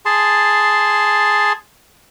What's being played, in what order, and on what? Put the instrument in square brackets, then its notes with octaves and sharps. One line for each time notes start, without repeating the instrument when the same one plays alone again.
[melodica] G#4 A5 C6